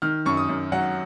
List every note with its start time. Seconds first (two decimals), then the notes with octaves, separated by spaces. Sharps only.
0.02 D#3 F6
0.26 F#2 C#6
0.37 D#6
0.49 F#2
0.72 F#3 F#5